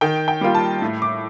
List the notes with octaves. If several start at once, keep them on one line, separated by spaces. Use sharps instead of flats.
D#3 G5
G5
G3 A#3 F4
A5
A2
D6